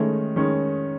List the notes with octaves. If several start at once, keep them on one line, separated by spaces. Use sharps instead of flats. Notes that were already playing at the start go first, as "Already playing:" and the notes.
Already playing: D#3 G#3 A3 C#4
D#3 G#3 C#4